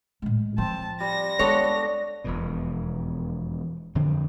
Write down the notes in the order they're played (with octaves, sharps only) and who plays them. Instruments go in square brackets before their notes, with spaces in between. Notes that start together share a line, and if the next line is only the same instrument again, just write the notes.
[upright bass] A2 G#3
[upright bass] F3 F4 [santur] C4 [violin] A5
[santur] G3 [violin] A#6
[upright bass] G#3 [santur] B3 D4 [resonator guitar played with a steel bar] A4 C#5
[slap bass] E1 F2 B2
F2 D3 C4